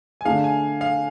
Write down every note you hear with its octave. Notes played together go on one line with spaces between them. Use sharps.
G#5
D3 A3 D4 G#4 F5
G#5
F5